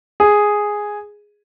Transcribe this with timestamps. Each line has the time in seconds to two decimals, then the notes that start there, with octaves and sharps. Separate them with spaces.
0.20 G#4